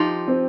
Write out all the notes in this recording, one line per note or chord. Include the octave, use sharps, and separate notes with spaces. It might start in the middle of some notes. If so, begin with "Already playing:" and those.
Already playing: F3 D#4 G4
C4